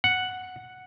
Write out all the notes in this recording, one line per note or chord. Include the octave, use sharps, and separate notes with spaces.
F#5